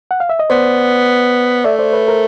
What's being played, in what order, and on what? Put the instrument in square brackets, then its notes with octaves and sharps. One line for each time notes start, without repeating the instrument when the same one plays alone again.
[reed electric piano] F#5
F5
E5
D#5
[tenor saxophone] B3 [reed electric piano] C5 D5
[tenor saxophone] A3 [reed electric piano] D5 E5
[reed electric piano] C5 D5
B4 C#5
A#4 C5